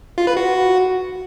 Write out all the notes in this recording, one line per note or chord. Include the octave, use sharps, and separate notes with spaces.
F4
B4
F#4